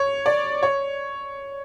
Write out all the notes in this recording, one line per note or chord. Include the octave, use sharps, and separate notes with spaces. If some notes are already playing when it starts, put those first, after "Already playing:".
Already playing: C#5
D5
C#5